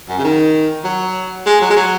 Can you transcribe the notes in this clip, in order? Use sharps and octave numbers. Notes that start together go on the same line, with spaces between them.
F#2
C#3
D#3
F#3
G#3
F#3
G#3
F#3